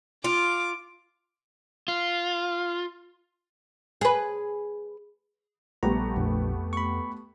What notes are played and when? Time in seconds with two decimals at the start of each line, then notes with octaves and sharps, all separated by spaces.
0.24 F4 D6
1.88 F4
4.01 G#4 B4
5.83 A#1 G3 A3 B3 G4 A#5
6.17 A#1 F2
6.73 B5 C#6